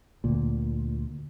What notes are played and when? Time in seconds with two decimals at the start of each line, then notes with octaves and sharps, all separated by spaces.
0.24 D2 A#2